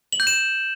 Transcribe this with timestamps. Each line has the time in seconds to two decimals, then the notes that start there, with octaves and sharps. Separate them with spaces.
0.12 F#7
0.20 G6
0.27 E7